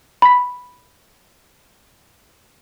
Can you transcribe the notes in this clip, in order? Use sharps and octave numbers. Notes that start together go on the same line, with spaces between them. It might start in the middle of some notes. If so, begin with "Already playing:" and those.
B5 B6